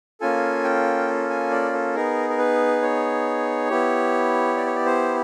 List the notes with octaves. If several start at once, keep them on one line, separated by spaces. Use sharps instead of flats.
A#3 C#4 F4 A4 G#5
G5
G#5
D5
A4
B3 D#4 G#4 A#4
A#4
B4
C#5
B3 E4 G4
D5
C#5
D5
C5